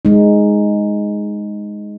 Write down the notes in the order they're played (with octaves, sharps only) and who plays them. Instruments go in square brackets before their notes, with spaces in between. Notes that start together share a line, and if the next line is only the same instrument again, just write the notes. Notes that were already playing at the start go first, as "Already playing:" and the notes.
[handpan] G#3 D#4